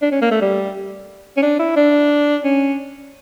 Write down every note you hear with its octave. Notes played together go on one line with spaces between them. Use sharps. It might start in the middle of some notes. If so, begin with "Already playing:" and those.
D4
C#4
A#3
A3
G3
C#4
D4
E4
D4
C#4